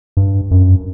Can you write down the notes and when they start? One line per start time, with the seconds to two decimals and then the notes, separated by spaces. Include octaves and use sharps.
0.17 G2
0.51 F#2